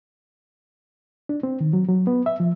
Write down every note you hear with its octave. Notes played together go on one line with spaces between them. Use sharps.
D4
C4
D#3
F#3
F#3
B3
E5
F3